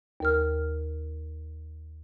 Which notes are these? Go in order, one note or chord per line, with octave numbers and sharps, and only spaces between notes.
D#2 A#4 F6